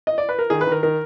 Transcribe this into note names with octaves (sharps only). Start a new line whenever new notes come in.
D#5
D5
B4
A#4
D#3 G#4
B4
D#3 A#4
D#3 A#4